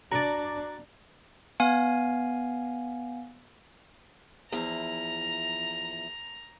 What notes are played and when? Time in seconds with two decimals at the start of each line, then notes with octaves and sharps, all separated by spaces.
0.12 D4 F#4 D5 A#5
1.60 B3 F5 G#5
4.52 E2 F3 E4 A#5